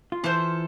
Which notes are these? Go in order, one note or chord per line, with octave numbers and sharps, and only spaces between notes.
F4
E3 E4 F4 A4 C5